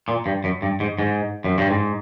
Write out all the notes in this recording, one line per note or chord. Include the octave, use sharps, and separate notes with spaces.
A#2
G2
F#2
G2
G#2
G#2
F#2
G2
G#2